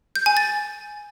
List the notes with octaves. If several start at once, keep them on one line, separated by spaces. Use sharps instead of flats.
G6
G#5
A6